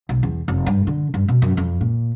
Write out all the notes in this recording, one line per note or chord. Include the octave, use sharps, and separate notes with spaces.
B1
E2
F1
G2
D3
G2
B2
F#2
F2
A#2